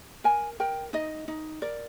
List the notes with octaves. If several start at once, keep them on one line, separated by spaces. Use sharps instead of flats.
A#4 G#5
A#4 G5
D#4 D#5
D#4
A#4 D5